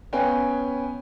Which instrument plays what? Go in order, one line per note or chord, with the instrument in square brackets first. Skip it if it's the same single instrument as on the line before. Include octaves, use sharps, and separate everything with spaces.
[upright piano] B3 C#4 B4 F5 G5 G#5